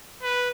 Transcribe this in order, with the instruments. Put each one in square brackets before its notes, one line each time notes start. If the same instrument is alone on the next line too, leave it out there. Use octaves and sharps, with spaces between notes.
[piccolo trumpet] B4